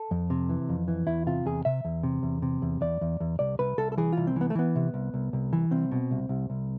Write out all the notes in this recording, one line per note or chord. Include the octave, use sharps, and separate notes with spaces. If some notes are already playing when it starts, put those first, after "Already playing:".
Already playing: A4
F2
C3
E3
F2
E3
E2 E4
C3 F4
E2 G#4
C3 E5
E2
C3
E2
C3
E2
E2 D5
E2
E2
C2 D5
C2 B4
C2 A4
A4
E3 G#4
C2 F4
C4
E3 B3
A3
E3 B3
C3
C2
C2
C2
E3
C2 C4
B2
C2
C2
C2